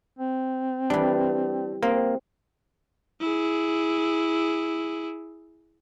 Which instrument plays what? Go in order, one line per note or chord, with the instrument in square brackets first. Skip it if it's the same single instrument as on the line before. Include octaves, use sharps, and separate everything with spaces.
[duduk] C4
[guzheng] E3 G3 [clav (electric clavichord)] D4
[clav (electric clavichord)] A#3 [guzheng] C4
[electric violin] E4 G#4